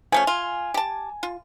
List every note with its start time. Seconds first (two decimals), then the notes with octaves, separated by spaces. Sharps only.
0.12 F3 A3 C#4 G#5
0.27 F4
0.74 G4 A5
1.23 F4